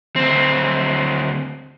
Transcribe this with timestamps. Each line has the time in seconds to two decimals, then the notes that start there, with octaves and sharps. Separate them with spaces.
0.16 D2 C4